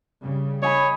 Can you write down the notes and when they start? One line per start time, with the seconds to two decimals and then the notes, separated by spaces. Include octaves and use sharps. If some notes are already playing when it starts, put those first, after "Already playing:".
0.22 C#3 G3
0.62 C#5 D#5 G#5 B5